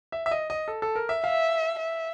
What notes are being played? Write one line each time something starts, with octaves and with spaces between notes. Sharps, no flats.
E5
E5
D#5
D#5
A4
A4
A#4
E5
E5 F5
E5